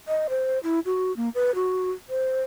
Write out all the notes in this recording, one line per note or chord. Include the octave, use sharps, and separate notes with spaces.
D#5
C5
E4
F#4
A#3
B4
F#4
C5